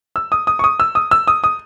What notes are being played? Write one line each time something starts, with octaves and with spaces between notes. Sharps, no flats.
E6
D#6
D#6
C#6
D#6
E6
D#6
E6
D#6
D#6